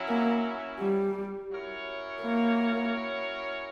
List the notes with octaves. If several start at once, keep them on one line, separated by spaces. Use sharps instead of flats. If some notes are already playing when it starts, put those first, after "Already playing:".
Already playing: F#3 C#4 E4
A#3
G3
F#3 C#4 E4 A#4 C#5
A#3